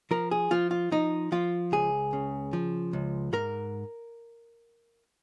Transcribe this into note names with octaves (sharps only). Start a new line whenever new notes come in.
F3 A#4
G#4
F3 F4
F4
F3 D#4
F3 F4
C#2 G#4
C#3
F3
C#2
G#2 A#4